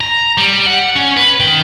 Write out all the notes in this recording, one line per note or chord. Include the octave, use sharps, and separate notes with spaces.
A#5
G3
F#5
C#4
B4
D#3 G5